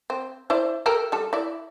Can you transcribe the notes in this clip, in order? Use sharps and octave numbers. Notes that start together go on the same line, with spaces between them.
C4
E4 C5 D5
G4 A4 A#4
G3 A4
E4 D5